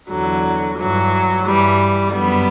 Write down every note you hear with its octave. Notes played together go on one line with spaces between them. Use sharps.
E2 D3 F#3
G2 E3 F#3
G2 E3 G3
F#2 D3 G3 B3